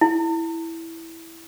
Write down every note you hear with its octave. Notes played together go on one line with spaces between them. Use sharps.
E4